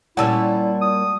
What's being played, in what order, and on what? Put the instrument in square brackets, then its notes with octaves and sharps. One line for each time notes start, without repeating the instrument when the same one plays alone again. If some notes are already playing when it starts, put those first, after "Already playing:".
[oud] A#2 G3 C#4 [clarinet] E4 [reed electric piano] F#5 A5 E6
[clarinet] D#6